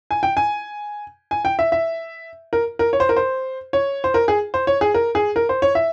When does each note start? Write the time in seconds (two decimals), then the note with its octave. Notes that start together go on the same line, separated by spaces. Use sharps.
0.11 G#5
0.23 G5
0.37 G#5
1.31 G#5
1.45 G5
1.59 E5
1.72 E5
2.53 A#4
2.79 A#4
2.93 C#5
3.00 C5
3.09 A#4
3.16 C5
3.73 C#5
4.04 C5
4.14 A#4
4.28 G#4
4.54 C5
4.67 C#5
4.81 G#4
4.94 A#4
5.15 G#4
5.36 A#4
5.49 C5
5.62 C#5
5.75 E5